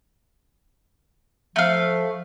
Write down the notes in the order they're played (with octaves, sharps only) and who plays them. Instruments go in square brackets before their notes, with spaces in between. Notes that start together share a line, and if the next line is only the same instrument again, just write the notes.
[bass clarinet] F3 [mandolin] A3 F5